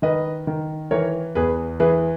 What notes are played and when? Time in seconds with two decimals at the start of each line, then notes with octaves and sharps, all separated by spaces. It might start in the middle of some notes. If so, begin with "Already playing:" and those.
0.02 D#3 B4 D#5
0.47 D#3
0.91 E3 A#4 C#5
1.35 E2 G#4 B4
1.80 E3 G#4 B4